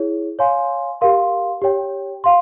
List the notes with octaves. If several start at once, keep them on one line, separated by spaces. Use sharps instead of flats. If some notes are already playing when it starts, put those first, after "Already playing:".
Already playing: E4 G#4 C#5
C#5 F5 G#5 C6
G4 A#4 F5 C6
G4 C#5 G5
F5 C6